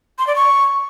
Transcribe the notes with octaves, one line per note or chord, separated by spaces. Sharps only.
C6
D5
C#6